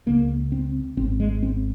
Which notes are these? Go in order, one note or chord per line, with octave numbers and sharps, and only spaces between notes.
C#2 C#3 A#3
C4
G#1 G#2 C4
G#3
C4